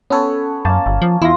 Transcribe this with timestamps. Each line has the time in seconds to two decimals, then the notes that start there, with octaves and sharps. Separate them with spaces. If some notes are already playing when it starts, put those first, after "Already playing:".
0.10 B3 C#4 A4 C#5
0.65 F#2 A#3 C#4 A5
0.86 G1
1.02 F3
1.22 E2 E4 F4 C6 A#6